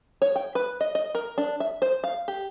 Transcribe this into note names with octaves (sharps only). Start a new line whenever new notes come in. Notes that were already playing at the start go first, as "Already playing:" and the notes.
C#5
G5
B4
D#5
D#5
A#4
D4
E5
C5
F5
G4